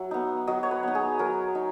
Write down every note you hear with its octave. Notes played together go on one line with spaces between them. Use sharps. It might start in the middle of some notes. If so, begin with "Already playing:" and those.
Already playing: F#3 E5
B3 D#4
F#3 D#5
C#5
B4
B3 D#4
G#4
F#3 A#4
D#4